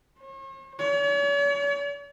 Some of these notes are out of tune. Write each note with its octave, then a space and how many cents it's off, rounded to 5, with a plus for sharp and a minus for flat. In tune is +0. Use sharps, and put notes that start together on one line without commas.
C#5 -45
C#5 +45